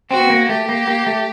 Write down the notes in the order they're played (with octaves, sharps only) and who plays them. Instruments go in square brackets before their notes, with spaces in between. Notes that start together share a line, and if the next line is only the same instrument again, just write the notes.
[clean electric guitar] C4 [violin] F#4
[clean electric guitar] B3
A#3
[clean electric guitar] A3 [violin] G4
[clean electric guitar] A#3
A#3
A3